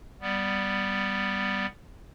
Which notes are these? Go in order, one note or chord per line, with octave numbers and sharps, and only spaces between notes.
G3 B3